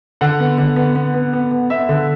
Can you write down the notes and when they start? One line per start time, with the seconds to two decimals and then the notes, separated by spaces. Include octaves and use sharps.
0.21 D3 F#5
0.40 B3
0.58 D3
0.76 B3
0.96 B3
1.14 B3
1.33 B3
1.51 B3
1.70 B3 E5
1.89 D3